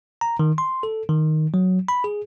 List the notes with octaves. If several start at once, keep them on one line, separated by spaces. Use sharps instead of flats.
A#5
D#3
C6
A4
D#3
F#3
B5
G#4